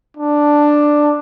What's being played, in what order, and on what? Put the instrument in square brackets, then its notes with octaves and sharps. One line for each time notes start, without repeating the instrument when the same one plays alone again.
[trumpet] D4